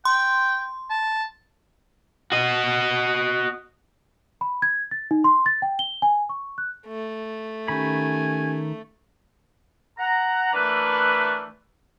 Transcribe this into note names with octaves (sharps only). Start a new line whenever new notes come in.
G5 C6
A5
F#4 D#5
B5
G#6
A6
D#4
C6
A6
G5
G7
G#5
C#6
F#6
A3
D#3 C#4 G4 G#5 B5
F#5 A#5
E3 A3 D4 A#4 B4